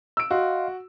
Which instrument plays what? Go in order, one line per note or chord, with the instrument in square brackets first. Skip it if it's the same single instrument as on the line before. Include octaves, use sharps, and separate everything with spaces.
[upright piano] E6 D7
[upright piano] F#4 [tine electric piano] D#5 F5 C6